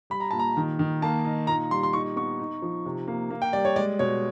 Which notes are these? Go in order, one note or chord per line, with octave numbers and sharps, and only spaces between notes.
G3 B5
A#5
A#2 A5
A#5
D#3
D#3
A#3 A5
D#4
A#2 A#5
G3 C6
C6
D#4 C#6
B3 C#6
D#4
F3
C3
A#3
A#3
G5
G3 D5
C#5
G#3 D5
B2 C#5